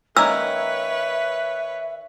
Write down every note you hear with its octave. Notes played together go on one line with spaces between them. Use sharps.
D#3 A#3 C#4 B4 C#5 E5 E6